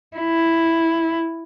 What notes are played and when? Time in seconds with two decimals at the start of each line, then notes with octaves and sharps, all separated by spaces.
0.17 E4